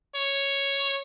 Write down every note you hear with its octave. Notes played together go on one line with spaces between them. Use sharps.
C#5